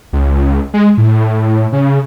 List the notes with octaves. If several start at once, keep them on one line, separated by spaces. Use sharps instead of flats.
C#2
G#3
A2
C#3